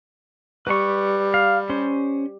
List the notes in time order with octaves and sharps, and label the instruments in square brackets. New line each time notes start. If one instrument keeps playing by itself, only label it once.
[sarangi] G3 [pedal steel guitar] B4 C#6
[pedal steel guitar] F5
C#4 C5